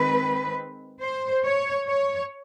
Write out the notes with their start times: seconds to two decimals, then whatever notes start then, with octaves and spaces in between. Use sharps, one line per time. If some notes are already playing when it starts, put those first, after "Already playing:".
Already playing: D#3 G#3 C4 B4
1.02 C5
1.44 C#5
1.88 C#5